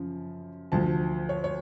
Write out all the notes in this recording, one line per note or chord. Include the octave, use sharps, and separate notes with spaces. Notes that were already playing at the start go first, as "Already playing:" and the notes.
Already playing: F#2 C#3 F3
D2 D3 F3 A5
C#5
C#5